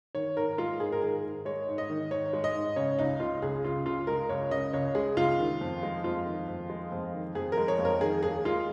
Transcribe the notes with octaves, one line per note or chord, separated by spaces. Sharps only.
D#3 C#5
G#2 A#4
G#3 F4
G#2 G#4
A#4
D#3 G#4
G#2
G#3 C#5
G#2
D#5
D#3
G#2 C#5
G#3
D#5
G#2
C#3 C#5
C#2 D#4
G#3 F4
C#2 G#4
C#3 F4
C#2 F4
G#3 A#4
C#2 C#5
C#3 D#5
C#2 C#5
G#3 G#4
C#2 F4
D#3
F2
G#3
F2 F4
D#3
F2
G#3
F2
D#3
F2 G#4
A#4
G#3
C#5
F2
A#4
D#3 G#4
D#2 G#4
G#3 F4